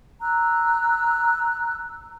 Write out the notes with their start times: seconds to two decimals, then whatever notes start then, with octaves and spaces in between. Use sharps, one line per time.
0.21 A#5 E6 F#6